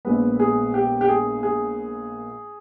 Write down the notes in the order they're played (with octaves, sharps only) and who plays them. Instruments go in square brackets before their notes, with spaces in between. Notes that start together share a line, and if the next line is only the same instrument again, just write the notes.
[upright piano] A#1 A#2 G#3 B3 B4
G#4
G4
G4
G#4
G#4